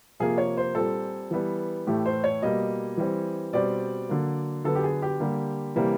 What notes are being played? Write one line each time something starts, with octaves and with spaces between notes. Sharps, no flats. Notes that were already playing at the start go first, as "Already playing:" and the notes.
C3 F3 A#3 G#4
C#5
C5
A#2 G3 C4 A4
E3 G3 B3
A2 E3 A3 G4
C5
C#5
B2 G3 A#3 D#5
E3 G3 C4
B2 G3 C4 D5
D3 F#3 A#3
D3 F#3 B3 A4
G4
G#4
G4
D3 G3 A#3
C3 E3 G3 A#3